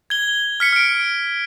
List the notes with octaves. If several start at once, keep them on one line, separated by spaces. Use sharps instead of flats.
G#6 G7
F6 B6 C#7
F6 D7